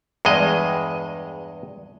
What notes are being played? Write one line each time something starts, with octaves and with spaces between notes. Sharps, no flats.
E2 G2 G#3 D#5